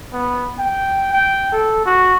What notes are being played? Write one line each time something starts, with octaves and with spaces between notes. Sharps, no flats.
B3
G5
G5
A4
F#4